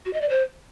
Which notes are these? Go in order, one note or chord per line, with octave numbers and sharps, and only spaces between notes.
F#4
D#5
D5
C5